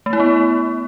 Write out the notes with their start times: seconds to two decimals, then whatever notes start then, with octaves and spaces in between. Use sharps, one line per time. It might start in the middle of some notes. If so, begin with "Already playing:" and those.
0.06 A3
0.13 E4
0.20 B3